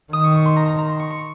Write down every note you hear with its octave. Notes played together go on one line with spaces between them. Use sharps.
D#3 D#6
C#6
C#6
C6
A#5
A#5
A#5
C6
C#6
C#6